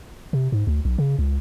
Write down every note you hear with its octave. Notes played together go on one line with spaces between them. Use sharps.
C3
G#2
D2
B1
C#3
C#2